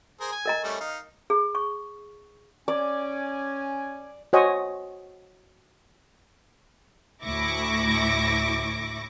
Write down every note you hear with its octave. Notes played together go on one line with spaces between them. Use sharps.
G#4 A#4 C5
G#5
A#4 D#5 A#5
G3 A3 C#4
D#4 F5
G#4
C#6
C#4 D5 G#5
F#4 C5 C#5 D#5 G#5
D2 A2 E4 C#6 D6 A#6